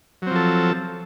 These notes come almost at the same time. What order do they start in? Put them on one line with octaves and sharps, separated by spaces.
F#3 C4 F3 A4